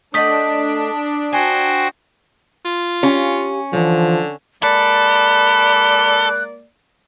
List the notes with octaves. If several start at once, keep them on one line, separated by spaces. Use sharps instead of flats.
A3 D4 D#5 F#5 D#6 B6
F#4 C5 G5 G#5
F4
C#4 G4 F5 G#5
B1 D3 E3 F3
G#3 A#3 A4 D5 B5 F#6